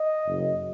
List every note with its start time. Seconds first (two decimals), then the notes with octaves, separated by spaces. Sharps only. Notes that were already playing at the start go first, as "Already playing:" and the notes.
Already playing: D#5
0.26 F#1 F#2 C#3